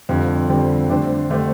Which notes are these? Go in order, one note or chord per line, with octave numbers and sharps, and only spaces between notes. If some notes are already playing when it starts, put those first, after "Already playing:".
F2 D3 G3 C4 G4
F2 D3 G3 C4 G4
D3 A3 D4 G4 C5
D3 A3 D4 G4 C5